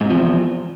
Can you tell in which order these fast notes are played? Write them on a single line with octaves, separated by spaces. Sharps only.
G#2 C3 F3 E2